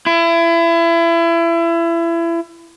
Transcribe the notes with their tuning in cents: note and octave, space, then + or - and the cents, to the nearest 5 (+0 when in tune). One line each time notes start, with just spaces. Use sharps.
E4 +30